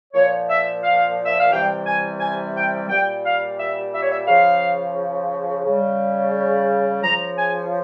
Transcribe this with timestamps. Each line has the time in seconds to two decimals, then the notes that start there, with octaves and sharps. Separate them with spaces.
0.14 A#2 F3 C#5
0.48 E5
0.82 F5
1.25 E5
1.39 F5
1.51 C3 E3 G3 G5
1.86 G#5
2.19 G#5
2.54 G5
2.88 A#2 G3 G5
3.23 F5
3.58 E5
3.92 E5
4.00 C#5
4.10 E5
4.27 C#3 F3 F5
5.64 C#3 G3
7.01 C#3 F3 A#5
7.37 G#5